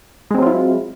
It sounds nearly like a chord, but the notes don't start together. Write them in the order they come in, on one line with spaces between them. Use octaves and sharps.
G#3 C4 F#3 F4 E4